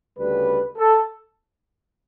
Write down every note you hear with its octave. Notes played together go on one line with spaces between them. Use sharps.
D2 C#3 G3 B4
A4